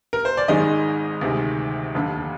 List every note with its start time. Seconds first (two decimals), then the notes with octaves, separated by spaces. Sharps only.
0.13 A#4
0.25 C5
0.37 D5
0.48 G#1 G#2 D#3 G#3 D#5
1.21 D2 C3 D#3 G#3
1.94 F1 D#2 D3